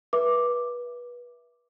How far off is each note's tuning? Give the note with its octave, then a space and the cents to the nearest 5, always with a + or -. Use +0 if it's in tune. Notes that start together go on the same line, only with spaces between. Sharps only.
B4 -25 E5 +5 D6 +0